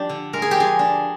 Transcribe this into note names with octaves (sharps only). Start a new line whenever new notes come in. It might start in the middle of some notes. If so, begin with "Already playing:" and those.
Already playing: F3 D4 G4
D3
G#3 A#4
G#4
G4
F3 G#4
D4